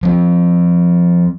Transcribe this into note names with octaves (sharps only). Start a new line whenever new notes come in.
F3 C4